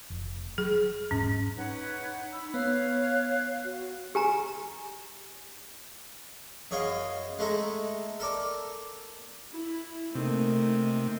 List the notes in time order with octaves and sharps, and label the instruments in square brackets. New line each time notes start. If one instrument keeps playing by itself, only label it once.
[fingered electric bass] F1
[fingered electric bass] F#3 [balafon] G#4
[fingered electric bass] E1 G#2 [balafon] C#4
[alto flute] D#4 [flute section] B4 C#5 F#5
[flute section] B5 E6
[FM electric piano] B3 [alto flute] C#5 [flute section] F5 F#6
[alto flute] F#4
[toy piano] G4 G#5 A#5
[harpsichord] F#2 G#4 C#5 D#5 F5
G#3 A3 A4 A#5
A4 A#4 D5
[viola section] E4
[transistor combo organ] C3 [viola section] A3 A#3 D#4